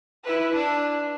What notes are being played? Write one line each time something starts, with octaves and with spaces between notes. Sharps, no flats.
E4 B4
D4